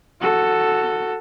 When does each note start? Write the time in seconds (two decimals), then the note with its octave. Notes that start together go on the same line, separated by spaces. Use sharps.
0.21 F#4 A4